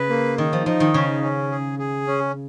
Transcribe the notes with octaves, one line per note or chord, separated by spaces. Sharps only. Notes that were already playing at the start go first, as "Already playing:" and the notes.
Already playing: C#3 B4
A#3
D#3 D#4
F3
F3 D#4
D#3
C#3 C#4
C#4
G#4
G#4
C#4